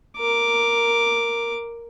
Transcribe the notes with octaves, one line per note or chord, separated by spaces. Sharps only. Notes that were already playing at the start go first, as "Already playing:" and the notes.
A#4 D6